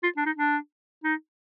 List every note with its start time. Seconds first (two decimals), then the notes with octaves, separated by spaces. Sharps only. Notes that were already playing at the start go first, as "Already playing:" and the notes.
0.03 F4
0.17 D4
0.26 D#4
0.37 D4
1.04 D#4